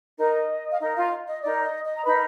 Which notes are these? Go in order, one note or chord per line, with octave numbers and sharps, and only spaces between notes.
D#4 A#4 D#5
F5
D#4 A#4 D#5
F4 F5
D#5
D#4 A#4 D5
D#5
D#5
A#5
D#4 A#4 B4 B5